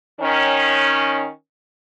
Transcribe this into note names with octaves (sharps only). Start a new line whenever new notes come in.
D#3 C#4